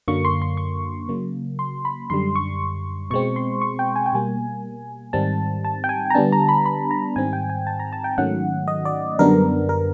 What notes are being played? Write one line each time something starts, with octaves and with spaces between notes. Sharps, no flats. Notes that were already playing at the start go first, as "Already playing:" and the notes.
F#2 D3 F#3 A#3 C#6
C6
C6
C#6
C#3 F#3 A#3
C6
B5
F#2 D3 G3 C6
C#6
B2 G#3 C4 C#6
C6
C#6
G5
G#5
G5
B2 G3 A#3 G#5
G#2 D#3 G3 C4 A5
A5
G5
G#5
A#5
D3 G3 B3 D4 A5
A#5
B5
B5
A#5
G#2 D#3 G3 C4 G#5
G5
G#5
A5
A#5
A5
G5
G#2 D#3 F#3 A3 C#4 F#5
D#5
D5
F#2 D3 G3 B3 D4 A#4
A#4